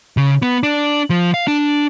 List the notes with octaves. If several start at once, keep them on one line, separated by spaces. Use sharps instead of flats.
C#3
B3
D4
F3
F5
D4